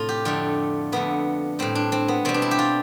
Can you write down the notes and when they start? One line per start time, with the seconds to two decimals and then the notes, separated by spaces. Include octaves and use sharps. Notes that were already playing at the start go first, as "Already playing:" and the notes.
Already playing: A2 C3 A3 F4
0.09 G4
0.25 F2 D3 A3 F4
0.92 F2 D3 A3 B3
1.59 A2 G3 C4
1.75 D4
1.92 C4
2.08 B3
2.25 B2 G3 C4
2.34 D4
2.42 E4
2.51 G4
2.59 F4